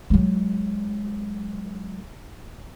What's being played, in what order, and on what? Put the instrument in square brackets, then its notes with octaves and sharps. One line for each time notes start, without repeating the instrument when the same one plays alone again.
[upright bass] F#3 G#3